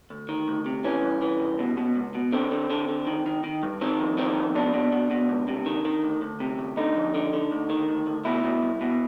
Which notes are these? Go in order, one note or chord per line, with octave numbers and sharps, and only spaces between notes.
D2
D#3
D2
C3
E3 C#4
C2
E3
C2
B2
B2
C#2
B2
D3 C4
D3
D3
D3
D#3
D#3
D#3
G2
D#3 C4
F2
D#3 C4
F2
B2 D4
B2
B2
B2
C#2
C3
D#3
D#3
D2
D2
C3
D2
D3 D#4
F2
D3
D3
D2
D#3
D2
D2
B2 E4
B2
C2
B2